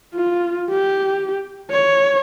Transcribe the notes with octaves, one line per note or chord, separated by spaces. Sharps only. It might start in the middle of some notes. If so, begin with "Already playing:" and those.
F4
G4
C#5